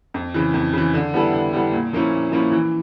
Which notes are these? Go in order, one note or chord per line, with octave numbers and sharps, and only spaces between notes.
F2
C#3 E3
F2
C#3 E3
D3
G3 B3 E4 A4
D3
G3 B3 E4 A4
A#2
F3 A#3 C#4 E4
A#2
F3 A#3 C#4 E4
E3